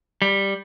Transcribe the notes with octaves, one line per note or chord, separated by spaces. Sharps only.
G3